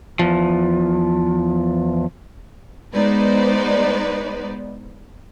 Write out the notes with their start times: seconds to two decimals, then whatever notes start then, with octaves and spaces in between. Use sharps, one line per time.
0.19 E2 F3
2.94 G#3 B3 D#4 B4 C5 D5